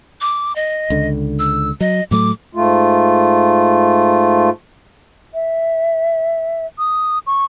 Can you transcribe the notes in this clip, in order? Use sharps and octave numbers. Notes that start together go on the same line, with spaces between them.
D6
D#5
C#2 D3
E6
F#3 D#5
A2 F#3 A3 D6
G#2 A3 F4
E5
D#6
C#6